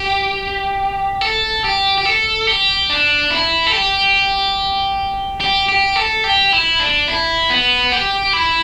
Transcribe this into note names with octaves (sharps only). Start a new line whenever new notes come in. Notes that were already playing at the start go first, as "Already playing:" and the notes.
Already playing: G4
A4
G4
G4
A4
G4
D4
E4
A4
G4
G4
G4
A4
G4
E4
D4
E4
B3
G4
E4